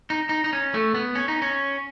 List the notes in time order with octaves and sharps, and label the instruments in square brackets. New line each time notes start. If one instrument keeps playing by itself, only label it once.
[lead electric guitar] D#4
D#4
D#4
C#4
A3
B3
C#4
D#4
C#4